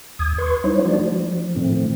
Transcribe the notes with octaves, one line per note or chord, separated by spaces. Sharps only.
D#2 D#6 G#6
B4 C6 C#6
G3 D#4 E4 C5 C#5
F3 G#3 A3 D4 F#4 D5
F3
A2 D#3 F3 A3 C4